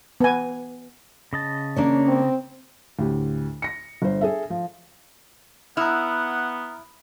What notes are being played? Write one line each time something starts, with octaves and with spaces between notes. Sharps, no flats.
B3 G#5
C#3 D#5 A5
A#3 C#4 D4 C#5
C4
D2 A2 G4
A#6 C#7
G1 C5
G#4 A4 E5
F3
B3 E4 F#5 A#5 D#6 F6